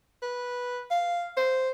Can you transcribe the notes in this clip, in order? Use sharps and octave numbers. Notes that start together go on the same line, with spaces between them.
B4
F5
C5